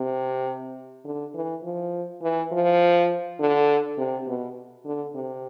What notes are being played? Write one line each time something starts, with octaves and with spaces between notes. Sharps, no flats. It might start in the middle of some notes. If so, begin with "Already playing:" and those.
Already playing: C3
D3
E3
F3
E3
F3
D3
C3
B2
D3
C3